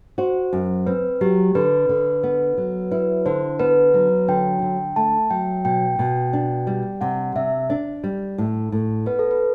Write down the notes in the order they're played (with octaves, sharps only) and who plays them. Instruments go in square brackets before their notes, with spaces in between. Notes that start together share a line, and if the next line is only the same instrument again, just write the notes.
[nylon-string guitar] F#4 [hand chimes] C5
[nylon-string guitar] F#2
[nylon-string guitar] C4 [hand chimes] B4
[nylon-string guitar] F#3 [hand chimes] G4
[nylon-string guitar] D3 [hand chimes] B4
[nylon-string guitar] D3
B3
F#3
[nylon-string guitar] E4 [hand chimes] B4
[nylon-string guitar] D3 [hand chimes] C5
[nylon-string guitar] B3 [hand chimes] B4
[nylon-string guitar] F#3
[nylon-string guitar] D3 [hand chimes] G5
[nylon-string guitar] D3
[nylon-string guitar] A3 [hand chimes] A5
[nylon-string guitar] F#3 [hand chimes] G5
[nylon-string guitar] B2 [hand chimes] G5
[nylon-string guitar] B2
D4
G3
[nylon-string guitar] C3 [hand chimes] F#5
[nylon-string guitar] C3 [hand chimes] E5
[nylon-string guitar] D4
G3
A2
A2
[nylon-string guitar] B3 [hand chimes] B4
[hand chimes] A4
B4